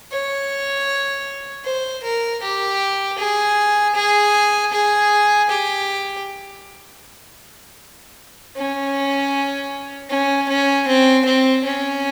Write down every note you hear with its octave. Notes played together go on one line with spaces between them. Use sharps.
C#5
C5
A#4
G4
G#4
G#4
G#4
G4
C#4
C#4
C#4
C4
C4
C#4